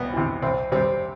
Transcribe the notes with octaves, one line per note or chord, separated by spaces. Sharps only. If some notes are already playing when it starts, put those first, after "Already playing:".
Already playing: C2 B3
C3 E3
C2 C4
C3 G3 C4